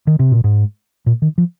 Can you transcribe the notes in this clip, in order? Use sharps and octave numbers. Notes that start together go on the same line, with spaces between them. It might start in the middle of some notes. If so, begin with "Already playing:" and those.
D#3
C3
A#2
G#2
A#2
D#3
F3